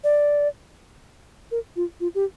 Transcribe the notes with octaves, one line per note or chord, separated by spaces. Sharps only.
D5
A#4
F4
F4
G4